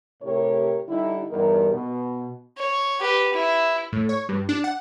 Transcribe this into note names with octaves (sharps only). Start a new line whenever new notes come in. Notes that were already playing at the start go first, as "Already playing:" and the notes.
A2 C3 G4 A#4 C#5
D3 G3 D#4 E4
E2 G2 G3 D#4 A#4
B2
C#5
G4 B4
E4
A2
C#5
G2
D4
F#5